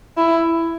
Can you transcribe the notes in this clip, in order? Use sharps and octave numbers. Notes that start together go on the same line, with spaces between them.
E4